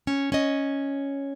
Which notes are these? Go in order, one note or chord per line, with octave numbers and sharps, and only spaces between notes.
C#4
C#4 D#5